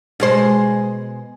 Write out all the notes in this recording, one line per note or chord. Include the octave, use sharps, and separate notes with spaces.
B2 G#3 C5